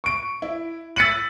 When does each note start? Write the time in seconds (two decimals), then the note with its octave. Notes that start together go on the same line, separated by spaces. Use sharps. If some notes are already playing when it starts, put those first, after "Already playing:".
0.04 C#6 D7
0.42 E4
0.96 E6 A6 B6 C#7 D#7 F#7